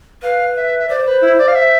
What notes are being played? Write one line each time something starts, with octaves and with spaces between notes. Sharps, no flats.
B4 F5
E5
E5
C5 D5
B4
E4
D5
F5
E5